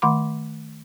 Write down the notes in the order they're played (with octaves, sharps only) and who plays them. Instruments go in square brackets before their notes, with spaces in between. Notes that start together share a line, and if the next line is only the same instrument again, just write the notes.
[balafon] D#3 A3 F#5 B5 C6 D6